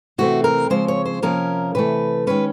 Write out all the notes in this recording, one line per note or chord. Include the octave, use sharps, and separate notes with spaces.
C3 E3 A3 C4 F#4
A#4
C#3 F3 G#3 C4 C5
C#5
C5
C3 F3 A#3 C#4 A#4
C3 E3 A3 B4
D#3 G#3 C#4 B4